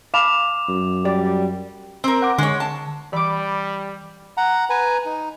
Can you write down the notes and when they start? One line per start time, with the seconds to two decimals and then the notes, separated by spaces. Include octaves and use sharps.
0.14 F5 A5 B5 D6 E7 F7
0.69 F#2
1.05 G3 D5
2.04 C4 A#4
2.22 F#5 D6
2.38 D3 G#3 C#5
2.60 A5
3.13 E3 G3 B5 D6
4.37 F#5 A#5
4.70 B4 G#5 A#5
5.06 D#4